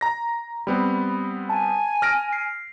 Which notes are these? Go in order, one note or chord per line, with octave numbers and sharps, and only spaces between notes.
A#5 A#6
G3 B3 C4 B5
G#5 A5
F6 A#6 D7
C7